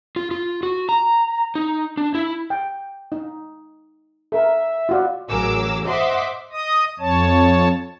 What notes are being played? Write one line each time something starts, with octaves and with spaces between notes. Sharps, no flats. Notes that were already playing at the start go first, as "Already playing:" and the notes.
F4
F4
F#4
A#5
D#4
D4
E4
G5
D#4
A4 A#4 E5
F4 F#4 D5
A1 F#3 G#4 A#4 D6 E6
C5 D#5 E5 F#5 C6 D6
D#5 D#6
F2 C#5 A5